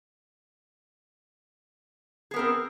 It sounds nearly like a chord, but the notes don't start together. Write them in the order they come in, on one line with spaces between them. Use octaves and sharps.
G#4 B3 A#4 C4